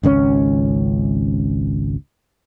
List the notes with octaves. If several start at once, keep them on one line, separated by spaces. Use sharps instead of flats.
G#1 C#2 B2 C#4